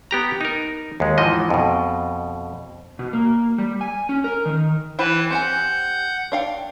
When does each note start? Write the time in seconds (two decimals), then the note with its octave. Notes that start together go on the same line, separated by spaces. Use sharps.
0.11 B3 G4 A#5
0.41 D#4 A#4
1.00 D#2 G#3
1.18 G#2 E3 F3 D#5
1.50 F2 B2
2.99 B2
3.13 A#3
3.58 G3
3.81 G#5
4.09 C#4
4.24 A#4
4.45 D#3
4.99 E3 E4 B4 C5 G5 A5
5.31 C4 G4 F#5 G#5 G6
6.32 D4 F5 G5